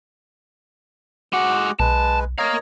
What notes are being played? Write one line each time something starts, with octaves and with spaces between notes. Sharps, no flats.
G#3 F#4 F#5 D6
B1 G#3 B4 A5
A#4 C#5 D#5 F5 A#5